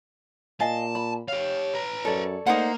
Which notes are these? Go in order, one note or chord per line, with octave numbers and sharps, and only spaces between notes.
A#2 D#5 F5 G#5 A5
B5
G4 C#5 F5
B4 A#5
F#2 A4 C#5 D5
A3 A#3 D#4 C5 F#5